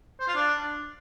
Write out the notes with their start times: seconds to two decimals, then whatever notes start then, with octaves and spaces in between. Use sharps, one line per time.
0.20 C5
0.28 F4
0.35 D4